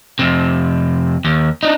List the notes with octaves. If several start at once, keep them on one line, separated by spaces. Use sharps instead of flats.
F2 C3
D#2
D4 D#4